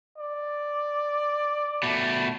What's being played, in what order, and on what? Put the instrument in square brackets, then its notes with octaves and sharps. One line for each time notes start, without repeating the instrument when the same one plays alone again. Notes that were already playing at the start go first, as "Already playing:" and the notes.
[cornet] D5
[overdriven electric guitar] B2 A3